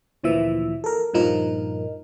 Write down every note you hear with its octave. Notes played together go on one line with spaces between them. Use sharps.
D2 A#2 E3 F3 E5
A4 A#4
G2 A#2 F3 D#4 A#4